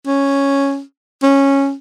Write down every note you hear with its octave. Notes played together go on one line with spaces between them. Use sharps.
C#4
C#4